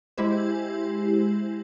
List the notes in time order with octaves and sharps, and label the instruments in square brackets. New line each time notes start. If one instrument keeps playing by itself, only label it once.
[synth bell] G#3 E4 G4 C5